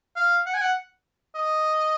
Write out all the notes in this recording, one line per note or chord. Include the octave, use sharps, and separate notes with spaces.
F5
F#5
G#5
F#5
D#5